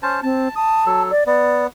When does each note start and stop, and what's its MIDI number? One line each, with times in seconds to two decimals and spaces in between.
0.03 0.20 61
0.03 0.20 72
0.03 0.20 81
0.23 0.48 60
0.23 0.55 81
0.56 1.02 81
0.56 0.84 87
0.86 1.11 54
0.86 1.11 69
1.11 1.24 74
1.26 1.67 59
1.26 1.65 74